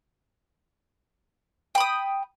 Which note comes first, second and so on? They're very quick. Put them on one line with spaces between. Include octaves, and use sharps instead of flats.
G5 B5 D#6